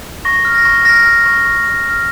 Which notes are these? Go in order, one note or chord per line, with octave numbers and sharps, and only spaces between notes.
C#6 A#6
F6
A#6
C#6
F6 A#6
F6
C#6
C#6
C#6
F6